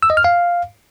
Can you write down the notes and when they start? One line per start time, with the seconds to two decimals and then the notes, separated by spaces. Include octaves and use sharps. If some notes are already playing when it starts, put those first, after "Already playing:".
0.03 E6
0.10 D#5
0.17 F6
0.24 F5